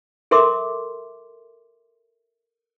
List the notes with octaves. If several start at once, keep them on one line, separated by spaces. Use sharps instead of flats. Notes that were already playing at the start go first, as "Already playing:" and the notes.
A4 A#4 E5 C6 D6